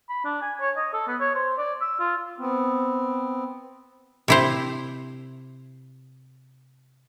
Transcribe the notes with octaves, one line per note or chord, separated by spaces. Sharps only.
B5
D4
G#5
C#5
D#5
A4
B3
C#5
C5
D5
E6
F4
B3 C4
C3 E4 C5